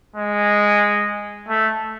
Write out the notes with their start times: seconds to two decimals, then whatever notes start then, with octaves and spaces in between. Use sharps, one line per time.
0.16 G#3
1.49 A3